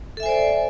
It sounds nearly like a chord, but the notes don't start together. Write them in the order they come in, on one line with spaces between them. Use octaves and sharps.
A4 E5 G#5 C5 D5